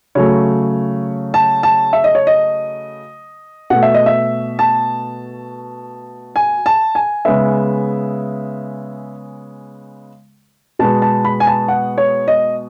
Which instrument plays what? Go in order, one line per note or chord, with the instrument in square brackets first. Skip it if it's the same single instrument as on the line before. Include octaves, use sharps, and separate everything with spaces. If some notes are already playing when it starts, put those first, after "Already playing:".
[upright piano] C#3 F#3 A3 C#5
A5
A5
E5
D#5
C#5
D#5
B2 A3 F#5
E5
D#5
E5
A5
G#5
A5
G#5
C#3 G#3 B3 E5
B2 G#3 B3 A5
A5
B5
G#5
A5
F#5
C#5
D#5